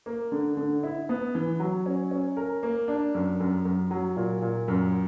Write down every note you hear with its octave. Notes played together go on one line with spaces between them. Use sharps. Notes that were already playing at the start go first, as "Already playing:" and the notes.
A#3
D3
D3
E4
B3
E3
F#3
C#4
C#4
A#4
A#3
D4
F#2
F#2
F#2
F#3
A#2
A#2
F#2